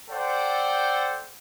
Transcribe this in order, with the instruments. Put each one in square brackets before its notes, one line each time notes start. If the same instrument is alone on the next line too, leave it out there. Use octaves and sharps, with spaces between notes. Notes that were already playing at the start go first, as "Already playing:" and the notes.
[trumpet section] A4 C5 D5 F#5 G5